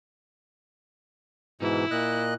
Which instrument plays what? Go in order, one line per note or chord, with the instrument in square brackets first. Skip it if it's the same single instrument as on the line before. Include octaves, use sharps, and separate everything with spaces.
[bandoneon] G#2 B2 E3 [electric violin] E4
[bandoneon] A#2 D#5 F#6